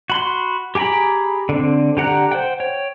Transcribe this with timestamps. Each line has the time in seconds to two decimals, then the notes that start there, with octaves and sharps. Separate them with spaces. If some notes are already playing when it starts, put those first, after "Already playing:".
0.10 F#4 B5 C6
0.75 G4 G#4 G5 A#5 B5
1.49 D3 C4
1.97 D3 G4 F#5 A#5 F#6
2.31 C5 F#5 G5
2.60 C#5 G5